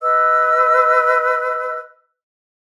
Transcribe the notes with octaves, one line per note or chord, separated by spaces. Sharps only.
B4 D#5 E6